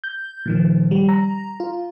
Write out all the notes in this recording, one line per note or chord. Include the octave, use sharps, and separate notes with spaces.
G6
A#2 D#3 F3
G3
A#5
F4